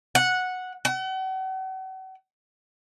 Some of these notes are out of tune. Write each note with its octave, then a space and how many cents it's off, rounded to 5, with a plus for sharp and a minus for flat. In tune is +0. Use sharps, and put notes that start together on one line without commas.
F#5 -10
F#5 +40